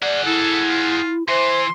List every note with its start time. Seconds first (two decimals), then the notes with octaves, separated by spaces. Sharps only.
0.02 G#4 D5 F#5
0.26 E4 A4
0.69 F4
1.28 E3 C5 C6